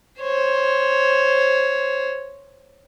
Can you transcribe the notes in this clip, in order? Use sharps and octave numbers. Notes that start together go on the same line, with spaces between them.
C5 C#5